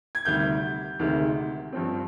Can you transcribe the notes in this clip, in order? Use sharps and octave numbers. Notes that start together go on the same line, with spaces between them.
G#6
D2 C3 D#3 G3 G6
D2 C3 D#3 G#3
G2 F3 C4